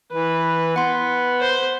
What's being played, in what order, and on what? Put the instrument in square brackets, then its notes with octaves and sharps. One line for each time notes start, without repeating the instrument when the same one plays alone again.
[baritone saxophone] E3 [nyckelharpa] B4
[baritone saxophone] B3 [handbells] F#5 C6
[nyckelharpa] C5